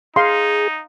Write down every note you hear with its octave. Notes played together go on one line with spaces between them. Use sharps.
D#4 G#4 F5 C6